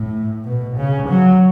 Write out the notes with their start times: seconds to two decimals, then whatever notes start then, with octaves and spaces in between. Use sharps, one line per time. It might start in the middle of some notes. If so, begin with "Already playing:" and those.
Already playing: A2
0.44 B2
0.77 C#3
1.09 F#3